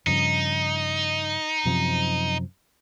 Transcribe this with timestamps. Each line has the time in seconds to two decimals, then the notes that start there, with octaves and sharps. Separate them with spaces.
0.07 G2 C#3 F3 D#4
1.66 F#2 C3 F3